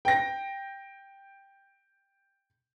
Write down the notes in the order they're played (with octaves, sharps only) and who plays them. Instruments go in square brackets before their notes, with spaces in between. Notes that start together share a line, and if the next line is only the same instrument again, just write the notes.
[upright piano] G5 A#6